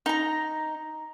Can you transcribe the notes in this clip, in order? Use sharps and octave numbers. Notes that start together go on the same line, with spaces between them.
D#4 A#5